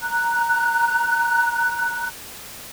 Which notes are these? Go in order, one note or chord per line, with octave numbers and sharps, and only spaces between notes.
A#5 F#6